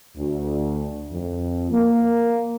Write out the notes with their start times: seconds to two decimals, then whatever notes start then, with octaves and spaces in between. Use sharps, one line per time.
0.17 D2
1.11 F2
1.71 A#3